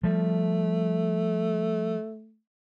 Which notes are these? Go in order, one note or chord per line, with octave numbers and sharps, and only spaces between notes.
F3 G3 A3